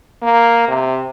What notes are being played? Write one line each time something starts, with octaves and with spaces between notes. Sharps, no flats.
A#3
C3